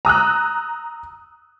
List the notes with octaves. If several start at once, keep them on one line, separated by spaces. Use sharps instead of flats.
A#5 D#6 E6 F#6